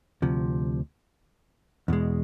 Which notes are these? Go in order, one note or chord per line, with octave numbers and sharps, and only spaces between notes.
D2 C3 F3
E2 B2 G#3